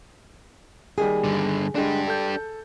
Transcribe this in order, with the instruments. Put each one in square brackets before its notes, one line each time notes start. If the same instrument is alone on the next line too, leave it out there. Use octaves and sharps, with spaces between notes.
[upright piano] D#2 D#3 G3 [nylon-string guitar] G#4
[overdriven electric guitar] G2 D3
[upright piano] D3 G#3 [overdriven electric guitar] D4 G4
[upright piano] A4 G6